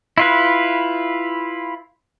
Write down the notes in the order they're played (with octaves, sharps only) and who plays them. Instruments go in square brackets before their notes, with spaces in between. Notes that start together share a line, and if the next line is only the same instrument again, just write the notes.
[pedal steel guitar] E4 F4 B4